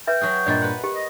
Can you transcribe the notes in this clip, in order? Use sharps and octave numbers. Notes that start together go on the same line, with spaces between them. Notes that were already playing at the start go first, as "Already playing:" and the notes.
B4 E5 G5
F#3 F#4 G#4
G2 A#2 D5 D#5
B4 F#5
G4
D#5